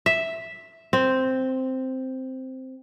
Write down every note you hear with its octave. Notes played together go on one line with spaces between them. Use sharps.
E5
C4